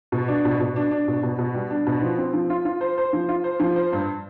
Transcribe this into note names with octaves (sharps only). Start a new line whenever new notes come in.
B2
D4
B2
B2
D4
D4
B2
B2
B2
G3
D4
B2
F3
C4
F3
F4
F4
C5
C5
F3
F4
C5
F3
C5
G2